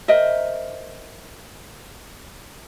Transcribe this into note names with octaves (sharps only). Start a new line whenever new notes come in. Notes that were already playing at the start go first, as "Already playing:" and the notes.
A#4 C5 D#5 E5